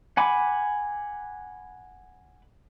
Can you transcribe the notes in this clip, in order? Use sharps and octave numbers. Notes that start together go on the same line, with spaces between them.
F#5 G#5 B5 D6